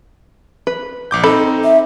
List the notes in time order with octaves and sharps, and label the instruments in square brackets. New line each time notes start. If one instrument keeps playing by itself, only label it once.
[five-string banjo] B4
[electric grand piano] A#1 D6 G6
[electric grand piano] C4 D#4 [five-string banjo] A4 B5
[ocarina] E5